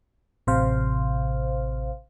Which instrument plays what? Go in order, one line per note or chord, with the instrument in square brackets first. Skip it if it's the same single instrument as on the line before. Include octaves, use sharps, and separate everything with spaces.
[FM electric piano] A1 C3 C5 F5